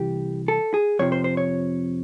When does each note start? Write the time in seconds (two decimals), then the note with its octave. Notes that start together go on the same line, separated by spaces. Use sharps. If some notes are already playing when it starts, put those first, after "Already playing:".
Already playing: C2 E3 G4
0.48 A4
0.74 G#4
0.99 F2 C3 F3 C#5
1.12 C5
1.24 C5
1.37 C#5